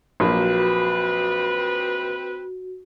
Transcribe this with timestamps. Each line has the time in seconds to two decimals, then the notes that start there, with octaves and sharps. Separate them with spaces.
0.20 A#1 F#3 A#3 C4 F#4 B4